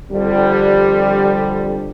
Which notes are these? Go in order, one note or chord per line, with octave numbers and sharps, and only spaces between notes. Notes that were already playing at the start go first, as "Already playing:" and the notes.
F2 D3 G3